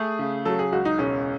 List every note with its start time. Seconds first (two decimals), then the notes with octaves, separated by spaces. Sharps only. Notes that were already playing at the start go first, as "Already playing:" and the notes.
Already playing: A3 G#4
0.19 C#3
0.45 F#3 A4
0.59 G#4
0.72 C#2 F#4
0.85 D#4
0.98 E1 C#4